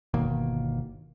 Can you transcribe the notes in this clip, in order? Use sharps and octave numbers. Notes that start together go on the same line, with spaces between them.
G1 B2 D#3 A#3